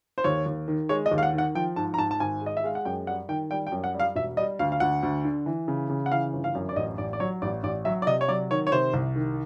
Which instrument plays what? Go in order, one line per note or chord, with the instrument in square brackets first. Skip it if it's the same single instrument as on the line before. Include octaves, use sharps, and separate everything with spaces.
[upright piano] C5
D#2 C#5
D#2
D#3
G#3 C#5
D#5
D#2
F5
F#5
D#3
F#5
F3 G5
G#2 A5
A#5
G#2 A5
A5
G#1 G#5
G#3
D#5
E5
G#3 F5
F#5
F#2 G5
G3 F#5
D#3 G5
G3 G5
G5
F#2
F#5
G3
F5
E1 E5
G3 D#5
D2 F5
F5
D2 F#5
D2
D3
E3
C#3
C#3
F#5
E3 F5
G1
F5
F#2
D5
A1 D#5
A1 D5
D5
F#3 C#5
A1 D5
A1 D5
F#3 E5
D5
C3 D#5
C#5
F#3 D5
D#3 C#5
C#5
C3 C5
C2
D#3